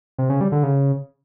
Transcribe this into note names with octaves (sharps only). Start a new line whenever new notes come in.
C3
C#3
G3
D3
C#3